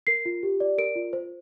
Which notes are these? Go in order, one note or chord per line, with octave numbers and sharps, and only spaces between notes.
A#4 C7
F4
G4
D5
A#4 D7
F4
C5